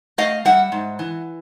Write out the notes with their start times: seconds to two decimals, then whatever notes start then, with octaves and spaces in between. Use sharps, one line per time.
0.18 A3 D#5 F5
0.45 G3 E5 F#5
0.72 G#2
0.99 E3